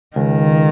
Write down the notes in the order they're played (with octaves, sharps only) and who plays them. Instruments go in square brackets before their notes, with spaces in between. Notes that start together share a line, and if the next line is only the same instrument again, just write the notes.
[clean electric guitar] C#2 [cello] D#3